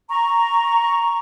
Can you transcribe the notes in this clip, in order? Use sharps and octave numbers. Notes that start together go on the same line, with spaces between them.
A#5 C#6